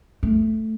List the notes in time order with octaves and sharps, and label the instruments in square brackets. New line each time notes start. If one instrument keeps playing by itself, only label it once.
[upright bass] A3